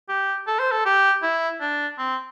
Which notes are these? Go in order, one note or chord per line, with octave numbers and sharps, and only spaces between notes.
G4
A4
C5
A4
G4
E4
D4
C4